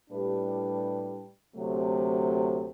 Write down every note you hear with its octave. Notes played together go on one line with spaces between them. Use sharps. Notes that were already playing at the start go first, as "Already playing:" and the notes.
A2 G3 D4 G4 B4
D2 C3 F#3 A3